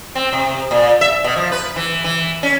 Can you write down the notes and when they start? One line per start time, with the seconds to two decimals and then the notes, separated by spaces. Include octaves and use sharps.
0.15 C4
0.33 C3
0.71 A#2
1.01 E5
1.24 B2
1.36 F3
1.52 B4
1.76 E3
2.04 E3
2.43 C#4